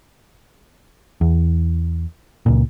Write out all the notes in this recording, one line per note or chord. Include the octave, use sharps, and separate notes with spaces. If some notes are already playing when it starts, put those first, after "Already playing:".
E2
C#2 A#2